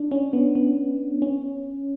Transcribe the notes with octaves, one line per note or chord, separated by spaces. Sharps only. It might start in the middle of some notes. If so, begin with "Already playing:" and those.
Already playing: D4
C#4
B3
B3
C#4